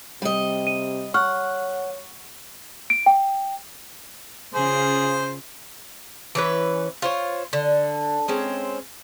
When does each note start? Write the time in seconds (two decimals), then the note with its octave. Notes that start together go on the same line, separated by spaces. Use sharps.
0.22 C3 G3 D#5
0.67 D#7
1.14 C#5 F#5 C#6 F6
2.90 D7
3.06 G5
4.54 C#3 F4 G#4 C5
6.35 E3 C#4 B4
7.02 F4 C5 C#5
7.53 D3
8.28 G#3 C4 C#4